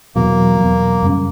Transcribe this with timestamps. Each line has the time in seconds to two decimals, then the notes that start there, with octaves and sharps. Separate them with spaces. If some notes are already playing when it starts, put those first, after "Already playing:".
0.16 E2 B2 F#3 A#3
0.59 E2 B2 F#3
1.02 F#2 C#3 G3 C#4